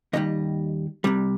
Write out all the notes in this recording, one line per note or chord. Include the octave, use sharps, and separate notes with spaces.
D#2 D#3 G3 D#5
C2 C3 G3